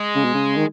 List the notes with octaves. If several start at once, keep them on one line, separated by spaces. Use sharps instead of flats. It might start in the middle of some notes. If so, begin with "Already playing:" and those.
Already playing: G#3
C#3
B2
C#3
D#3